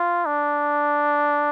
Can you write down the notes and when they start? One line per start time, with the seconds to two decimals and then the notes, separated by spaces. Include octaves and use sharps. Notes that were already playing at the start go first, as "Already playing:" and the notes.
Already playing: F4
0.26 D4